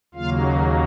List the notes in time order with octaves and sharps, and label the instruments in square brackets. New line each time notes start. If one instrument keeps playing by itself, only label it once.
[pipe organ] D#2 C#3 F#3 A#3 F4 F5